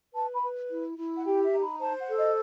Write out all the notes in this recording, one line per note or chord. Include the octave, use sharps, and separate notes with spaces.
B4 A5
B5
B4
E4
E4
F#5
G4 G5
E5
D#4
B5
C5 A5
F#5
A4
D#5